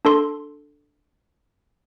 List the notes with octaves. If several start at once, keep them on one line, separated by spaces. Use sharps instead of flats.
D4 A4 C6